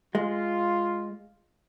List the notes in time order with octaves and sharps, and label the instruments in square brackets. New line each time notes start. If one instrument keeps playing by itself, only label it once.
[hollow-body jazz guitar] G#3 [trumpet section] F4